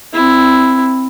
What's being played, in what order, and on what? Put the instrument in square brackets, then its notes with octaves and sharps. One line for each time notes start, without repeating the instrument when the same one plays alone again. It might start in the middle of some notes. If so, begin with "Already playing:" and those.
[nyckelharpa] C4 E4